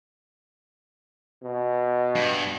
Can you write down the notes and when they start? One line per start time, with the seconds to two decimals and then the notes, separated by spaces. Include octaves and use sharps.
1.43 B2
2.15 G2